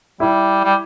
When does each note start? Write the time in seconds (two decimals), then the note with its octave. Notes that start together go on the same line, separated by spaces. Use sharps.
0.20 G3 E4
0.64 G3